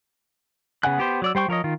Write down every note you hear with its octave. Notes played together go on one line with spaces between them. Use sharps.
C#3 B3 F#5 G#5 F#6
B3 G4 C5
F#3 D5 E6
G3 C5 G5 C#6
F3 A#4 C#5 D#5
D#3 F4